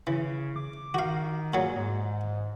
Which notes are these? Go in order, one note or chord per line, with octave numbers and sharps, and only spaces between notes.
C#3 E3
D6
D#3 F#4 F5
A#2 F#3 G#4
G#2